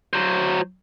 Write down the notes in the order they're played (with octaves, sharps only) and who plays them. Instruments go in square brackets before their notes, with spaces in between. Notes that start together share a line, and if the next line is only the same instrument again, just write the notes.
[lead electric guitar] F#3 C5